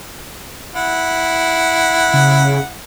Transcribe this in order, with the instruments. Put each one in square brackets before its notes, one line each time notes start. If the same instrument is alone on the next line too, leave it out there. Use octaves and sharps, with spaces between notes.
[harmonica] E4 F#5
[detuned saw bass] C#3